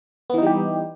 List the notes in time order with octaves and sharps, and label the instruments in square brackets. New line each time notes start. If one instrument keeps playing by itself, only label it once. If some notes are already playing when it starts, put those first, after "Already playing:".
[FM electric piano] B3
E3
D#4
G3
G4